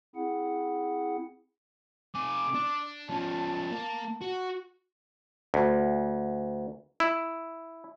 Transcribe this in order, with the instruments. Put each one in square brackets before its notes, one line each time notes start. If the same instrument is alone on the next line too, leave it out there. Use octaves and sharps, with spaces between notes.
[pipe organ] C4 E4 G#4 F#5
[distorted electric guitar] C3 G#5 [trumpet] D6
[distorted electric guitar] D4
[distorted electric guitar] F3 C#4 [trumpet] A5
[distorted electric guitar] A#3
F#4
[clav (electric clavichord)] D2
E4